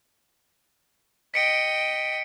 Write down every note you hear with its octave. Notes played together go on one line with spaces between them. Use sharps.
D#5 G5 B6 C#7 D7